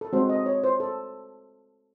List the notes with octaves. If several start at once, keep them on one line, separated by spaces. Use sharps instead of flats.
A4
G#3 C4 F#4 C5
D#5
C#5
C5
A4